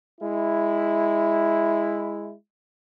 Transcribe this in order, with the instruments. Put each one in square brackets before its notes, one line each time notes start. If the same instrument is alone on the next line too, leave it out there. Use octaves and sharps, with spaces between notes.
[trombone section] G#3 E4